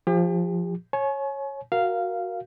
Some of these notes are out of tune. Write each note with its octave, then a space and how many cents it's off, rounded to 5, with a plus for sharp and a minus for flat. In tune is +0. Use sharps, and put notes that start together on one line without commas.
F3 +0 G4 +40
C#5 -15 G#5 +35
F#4 +0 A#4 +0 F5 -10